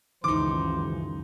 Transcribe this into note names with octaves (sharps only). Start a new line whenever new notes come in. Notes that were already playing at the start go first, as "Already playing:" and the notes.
C#2 F#2 D#3 E3 D#4 C5 D6